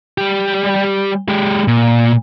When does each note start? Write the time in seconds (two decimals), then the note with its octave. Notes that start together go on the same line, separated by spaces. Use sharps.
0.18 G3 G4
1.28 G#3 G4
1.68 A#2